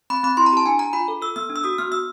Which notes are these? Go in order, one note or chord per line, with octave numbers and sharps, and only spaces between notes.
C4 B5
C4 B5
E4 C6
A#5
G4 A5
D4 G#5
D4 A#5
F4 B5
A4
A4 E6
B3 E6
D4
E6
F#4 D#6
B3 F6
B3 E6